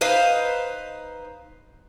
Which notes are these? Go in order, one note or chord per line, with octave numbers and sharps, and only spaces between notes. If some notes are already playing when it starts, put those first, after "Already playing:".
D#4 B4 C5 F5